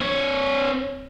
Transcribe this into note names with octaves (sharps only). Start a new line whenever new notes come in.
C4 C#5